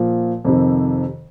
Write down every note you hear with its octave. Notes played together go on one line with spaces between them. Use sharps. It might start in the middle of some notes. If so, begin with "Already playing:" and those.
Already playing: A#2 F3
F2 C3 D#3